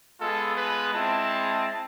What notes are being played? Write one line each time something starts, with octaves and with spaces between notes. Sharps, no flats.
G#3 B3 F4 A4
B4
G#3 C4 E4 A5